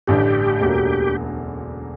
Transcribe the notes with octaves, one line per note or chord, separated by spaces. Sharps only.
A1 G2 D3 G4
E1 D2 D3 F#3 A#3